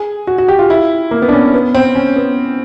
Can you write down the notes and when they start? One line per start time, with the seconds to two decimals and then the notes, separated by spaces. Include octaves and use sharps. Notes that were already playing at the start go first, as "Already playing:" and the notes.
Already playing: G#4
0.27 F#4
0.38 F#4
0.48 G4
0.59 F4
0.70 E4
1.11 A#3
1.22 B3
1.28 D4
1.33 C#4
1.54 B3
1.75 C4
1.95 C#4
2.16 B3